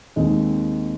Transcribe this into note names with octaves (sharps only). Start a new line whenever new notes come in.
D#2 D#3 G#3 C4 D#4